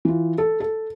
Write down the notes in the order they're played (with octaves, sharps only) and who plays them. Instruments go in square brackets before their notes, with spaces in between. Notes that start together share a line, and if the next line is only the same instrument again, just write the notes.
[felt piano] E3 F4
A4
A4